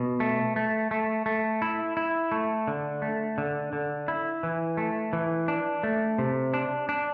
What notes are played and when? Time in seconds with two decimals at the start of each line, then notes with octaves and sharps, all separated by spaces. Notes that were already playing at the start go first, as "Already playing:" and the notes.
Already playing: B2
0.20 A3
0.56 A3
0.91 A3
1.26 A3
1.62 E4
1.97 E4
2.32 A3
2.68 D3
3.02 A3
3.38 D3
3.73 D3
4.08 E4
4.43 E3
4.77 A3
5.13 E3
5.48 D4
5.83 A3
6.18 C3
6.54 D4
6.89 D4